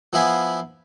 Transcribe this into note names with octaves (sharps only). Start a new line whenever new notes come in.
F3 B3 E4 F5 G#5 B5